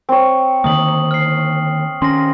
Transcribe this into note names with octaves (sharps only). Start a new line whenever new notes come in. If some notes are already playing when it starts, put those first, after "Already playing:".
C4 C#5
D3 D#3 A#3 D#6 F#7
F6 C7
D#3 C#4 C6 A#6